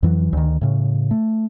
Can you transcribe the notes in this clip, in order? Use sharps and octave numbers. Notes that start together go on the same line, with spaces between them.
F2 E3 F#3
D2 D#3
A2 C#3
A3